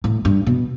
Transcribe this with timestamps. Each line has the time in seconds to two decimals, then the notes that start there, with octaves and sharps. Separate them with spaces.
0.04 A2
0.25 G2
0.47 B2